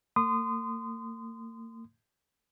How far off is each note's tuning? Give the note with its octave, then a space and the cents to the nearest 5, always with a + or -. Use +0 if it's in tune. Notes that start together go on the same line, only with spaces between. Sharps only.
A#3 -40 C6 -30 D#6 -20